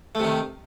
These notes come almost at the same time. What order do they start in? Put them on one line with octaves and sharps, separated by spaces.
A3 C3 D#3